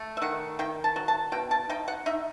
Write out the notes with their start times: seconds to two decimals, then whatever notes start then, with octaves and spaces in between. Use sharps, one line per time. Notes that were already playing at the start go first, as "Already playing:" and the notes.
Already playing: A3
0.17 E5
0.22 D#3 F#5
0.59 D#3 G5
0.84 A5
0.96 F#3
1.08 A5
1.32 B2 G5
1.51 A5
1.69 D#4 G5
1.88 F#5
2.06 D#4 E5